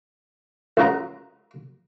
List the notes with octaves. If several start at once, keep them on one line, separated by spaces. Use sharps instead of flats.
C#2 C#3 F#4 A#5